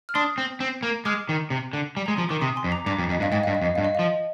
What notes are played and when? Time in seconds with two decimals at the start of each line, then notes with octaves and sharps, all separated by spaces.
0.09 F6
0.15 D4 C6 D#6
0.38 C4
0.60 C4
0.83 A#3
1.05 G#3 D6 F6
1.29 D#3
1.50 C3
1.73 D3
1.97 G3
2.06 G#3 A#5
2.17 F3 C6
2.29 D#3 D6
2.41 C3 C6 D#6
2.56 G#5 C6
2.64 F2
2.72 A#5 D6
2.86 G2 A#5 D6
2.99 F2
3.09 F2
3.12 D#5
3.20 G2 F5
3.32 G#2 D#5 G5
3.43 F5
3.47 G2
3.55 D#5
3.62 F2
3.65 D#5
3.75 G2 F5
3.85 D#5
3.95 F3 F5
4.03 D#5